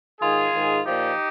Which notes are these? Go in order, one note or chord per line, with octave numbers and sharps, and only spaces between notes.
G#2 D#3 F4 G#4
G#2 D#3
A#2 F3 D#4 G4